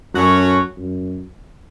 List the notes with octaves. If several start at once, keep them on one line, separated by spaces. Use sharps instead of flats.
F#2 A3 C#4 F#4 C#5
F#2